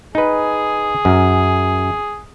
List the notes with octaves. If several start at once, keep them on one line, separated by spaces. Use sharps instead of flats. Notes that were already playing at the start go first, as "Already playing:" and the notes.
D#4 G#4 B4
F#2